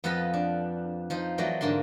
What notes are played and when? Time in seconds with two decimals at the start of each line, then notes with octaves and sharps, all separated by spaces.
0.04 F2 F3 B3 A4 B4 D#5
0.34 D4
1.10 F3 D#4 C5
1.38 E3 F#3 A3 D5 D#5
1.61 G#2 D3 A#3 D4 C6